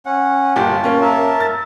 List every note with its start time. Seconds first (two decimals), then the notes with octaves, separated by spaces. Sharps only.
0.06 C#4 F#5
0.56 G1 A#2 G4 A5
0.84 A#3 C#4
1.01 A#4 E5 A5
1.40 A6